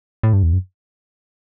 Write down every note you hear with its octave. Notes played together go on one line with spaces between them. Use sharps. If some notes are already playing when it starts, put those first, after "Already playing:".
A2
G2
E2
F#2